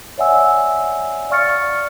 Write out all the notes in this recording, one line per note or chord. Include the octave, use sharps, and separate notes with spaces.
C#5 D5 E5 F#5 G#5 E6
D5 F5 C#6 F6 A6 C#7